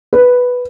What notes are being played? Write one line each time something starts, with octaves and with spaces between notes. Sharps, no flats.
B4